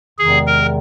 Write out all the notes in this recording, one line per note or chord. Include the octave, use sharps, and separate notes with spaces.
E2 C3 D#3 G#3 G#4
A#4